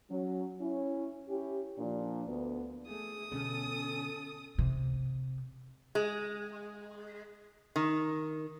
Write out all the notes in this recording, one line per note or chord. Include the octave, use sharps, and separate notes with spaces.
F#3 C#4
C#4 E4
C#4 E4 G4
A#2 F3 D4
D2 B3
A3 G#4 D#6
B2 D3 B3 C#4 A4
C3
G#3
D#3